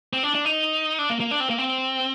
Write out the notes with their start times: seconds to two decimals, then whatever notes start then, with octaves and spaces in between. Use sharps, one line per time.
0.13 C4
0.23 D4
0.35 D4
0.45 D#4
0.99 D4
1.10 A#3
1.20 A#3
1.31 D4
1.40 C4
1.50 A#3
1.58 C4